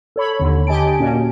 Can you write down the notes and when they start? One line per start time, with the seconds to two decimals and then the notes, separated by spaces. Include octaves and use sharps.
0.16 A4 C#5 B5
0.39 D#2 D3
0.67 D3 G4 D#5 G#5 A5 D7
0.99 A#2 A#3 C#4 F#4